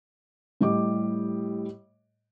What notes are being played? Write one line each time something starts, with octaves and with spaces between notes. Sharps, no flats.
A2 G3 G4 D#5 D6